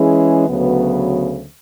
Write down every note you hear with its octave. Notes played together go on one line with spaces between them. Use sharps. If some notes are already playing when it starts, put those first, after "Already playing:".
Already playing: E3 G#3 C#4 E4 G#4
D2 C#3 F#3 B3